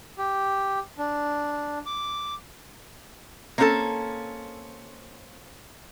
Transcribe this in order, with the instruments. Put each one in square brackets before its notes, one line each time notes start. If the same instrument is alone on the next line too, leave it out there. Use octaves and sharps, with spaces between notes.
[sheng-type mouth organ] G4
D4
D6
[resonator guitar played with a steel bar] A#3 C4 C#4 D#4 A4 A5